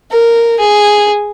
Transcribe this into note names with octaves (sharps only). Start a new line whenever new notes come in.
A#4
G#4